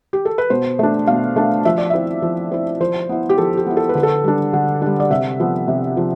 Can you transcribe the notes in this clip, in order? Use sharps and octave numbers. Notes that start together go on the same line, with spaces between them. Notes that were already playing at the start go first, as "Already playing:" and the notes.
G4
A4
B4
B2 C5
A3 D4
B2 F5
A3 D4
F3 E5
D5
C4 E4 E5
F3
C4 E4
F3 C5
B3 E4
G4
F3 A4
G4
B3 E4
A4
B4
D3
A4
G3 D4
D3
G3 D4
D5
C3 E5
F3 B3
C3
F3